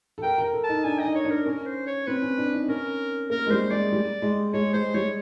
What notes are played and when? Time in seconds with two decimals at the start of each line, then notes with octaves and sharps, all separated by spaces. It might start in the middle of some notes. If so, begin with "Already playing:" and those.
0.18 A4
0.23 A#4 G5
0.38 A#4
0.53 A4
0.64 A5
0.69 D#4
0.84 D4 G#5
1.00 D#5
1.05 D#4
1.15 C#5
1.25 D4
1.30 A#4
1.46 C#4 A#4
1.66 C5
1.87 C#5
2.07 C4 B4
2.22 C#4
2.38 D4
2.53 D#4
2.68 C#4 A#4
3.30 A#3 A#4
3.46 G#3
3.50 G3 C5
3.71 G#3 D5
3.92 G3
4.22 G#3
4.53 G#3 C#5
4.73 G#3 C5
4.94 G3 C#5